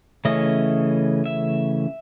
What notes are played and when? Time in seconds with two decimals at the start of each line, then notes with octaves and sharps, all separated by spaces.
0.25 C#3 E3 A3 C#4 D#5
1.26 E5